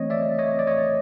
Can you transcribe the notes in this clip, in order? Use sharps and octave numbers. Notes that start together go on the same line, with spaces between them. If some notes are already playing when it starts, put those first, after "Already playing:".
Already playing: E3 A3 C4 C#5 D#5
D5 E5
C#5 D#5
D5
C#5 D#5